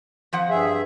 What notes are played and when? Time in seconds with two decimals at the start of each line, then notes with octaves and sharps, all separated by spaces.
0.33 F2 F3 F#5
0.49 G2 G#4 E5